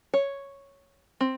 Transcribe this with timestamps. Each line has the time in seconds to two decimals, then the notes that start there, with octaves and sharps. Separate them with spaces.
0.14 C#5
1.21 C4